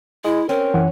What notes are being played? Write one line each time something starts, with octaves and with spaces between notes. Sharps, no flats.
G#3 E4
C4 C#4 A#4
F#2 E3 F#5